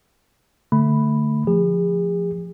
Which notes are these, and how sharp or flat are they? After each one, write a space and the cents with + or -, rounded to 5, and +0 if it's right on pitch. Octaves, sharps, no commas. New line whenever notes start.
D3 +0 A3 +5 B5 +0
F3 +0 G#4 -40